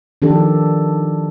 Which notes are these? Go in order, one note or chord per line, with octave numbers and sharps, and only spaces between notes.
D#3 F3 D4 G4 A4